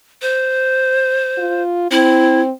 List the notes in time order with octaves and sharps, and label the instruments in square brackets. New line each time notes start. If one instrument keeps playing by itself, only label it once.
[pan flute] C5
[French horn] F4
[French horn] C4 [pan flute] E4